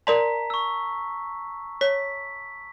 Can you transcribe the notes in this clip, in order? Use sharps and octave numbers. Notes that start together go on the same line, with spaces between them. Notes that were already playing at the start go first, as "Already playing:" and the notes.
A#4 D5 A5 A#5 C6 B6
C#6 E6
C#5 B6